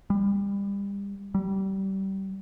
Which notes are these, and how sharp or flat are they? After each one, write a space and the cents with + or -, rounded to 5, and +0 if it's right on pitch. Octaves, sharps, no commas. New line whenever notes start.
G3 +30
G3 -25